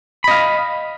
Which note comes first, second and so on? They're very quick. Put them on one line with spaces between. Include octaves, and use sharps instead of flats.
B5 D#5 F5